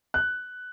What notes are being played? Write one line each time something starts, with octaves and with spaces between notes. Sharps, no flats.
F#6